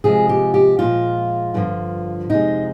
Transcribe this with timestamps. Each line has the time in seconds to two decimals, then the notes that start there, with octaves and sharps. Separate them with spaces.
0.04 C3 F3 G#3 G#4
0.29 G4
0.54 G4
0.79 A#2 F3 G#3 F4
1.54 G2 D3 F3
2.29 F2 C3 F3 G#3 D#4